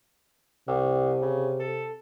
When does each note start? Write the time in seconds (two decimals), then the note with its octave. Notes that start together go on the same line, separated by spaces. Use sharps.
0.68 C2 C3
1.22 C#3
1.60 A4